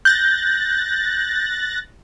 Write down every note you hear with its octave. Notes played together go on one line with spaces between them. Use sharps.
F#6 G6 A6 A#6